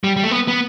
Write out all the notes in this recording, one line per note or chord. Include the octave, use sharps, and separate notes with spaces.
G3
G3
A3
B3
B3